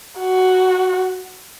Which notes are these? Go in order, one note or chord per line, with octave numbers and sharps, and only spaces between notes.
F#4